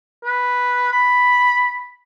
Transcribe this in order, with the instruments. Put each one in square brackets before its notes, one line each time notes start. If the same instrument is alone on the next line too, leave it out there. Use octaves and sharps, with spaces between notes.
[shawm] B4
B5